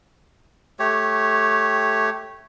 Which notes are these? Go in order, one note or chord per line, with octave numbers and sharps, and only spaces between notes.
A3 G4 C#5